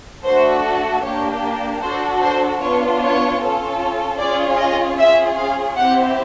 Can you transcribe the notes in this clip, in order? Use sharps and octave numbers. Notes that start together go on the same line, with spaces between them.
A3 D4 F#4 A4 C5
A#3 D4 G4 C#5
D4 F#4 A4 C5
C5
B3 D4 F4 C#5
C#5
C#4 F4 A4
C#4 F4 G#4 D5
D#5
C#4 F4 G#4 E5
F5
C4 E4 G4 F#5